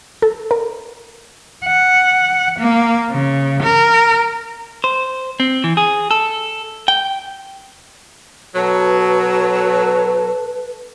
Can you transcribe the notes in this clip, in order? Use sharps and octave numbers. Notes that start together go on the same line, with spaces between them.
A4
A#4
F#5
A#3
C#3
A#4
C5
C4
E3
G#4
A4
G5
B2 F#3 A4 B4